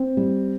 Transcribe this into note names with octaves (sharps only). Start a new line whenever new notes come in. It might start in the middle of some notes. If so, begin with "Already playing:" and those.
Already playing: C4
G3